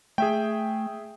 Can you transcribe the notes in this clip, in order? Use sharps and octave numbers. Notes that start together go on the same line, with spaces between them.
A3 G#4 E5 G5